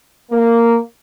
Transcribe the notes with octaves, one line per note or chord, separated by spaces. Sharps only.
A#3